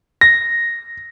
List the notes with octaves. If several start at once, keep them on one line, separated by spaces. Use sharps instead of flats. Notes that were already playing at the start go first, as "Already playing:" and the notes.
A#6